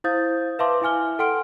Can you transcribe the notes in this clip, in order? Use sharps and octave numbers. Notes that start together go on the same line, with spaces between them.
E4 C5 F5 D#6 G6 A6
B4 E5 F5 A5 C6 D6
E4 E5 G#5 F6 G7
A4 F#5 G5 C6 F6 D7